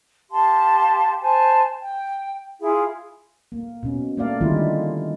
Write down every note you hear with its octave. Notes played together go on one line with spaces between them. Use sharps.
G4 F5 A5 C6
C5 G#5 A5
G5
E4 F4 G#4 F5
A#3
B2 C#4
A3 A#3 D5 F5
D3 D#3 G3 G#3 E4 F4